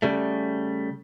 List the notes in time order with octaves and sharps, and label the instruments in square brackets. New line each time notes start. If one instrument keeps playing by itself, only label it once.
[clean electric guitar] C#3 G3 A3